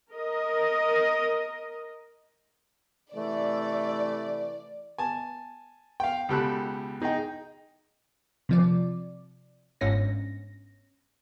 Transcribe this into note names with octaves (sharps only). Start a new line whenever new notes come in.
A#4 D#5
C3 E3 A3 D5
G#5 A5
F5 G5
C#2 B2 G4 A4 B5 F#6
D#4 G#4 D#5 G5
C3 F3 D5
G1 G#2 C#4 A#6